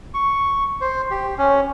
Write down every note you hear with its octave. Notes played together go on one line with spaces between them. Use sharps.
C#6
C5
G4
C#4